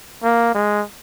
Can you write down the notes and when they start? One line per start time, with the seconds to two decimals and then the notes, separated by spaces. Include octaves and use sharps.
0.23 A#3
0.55 G#3